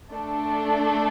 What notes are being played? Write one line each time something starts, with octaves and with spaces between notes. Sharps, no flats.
A3 D4 A4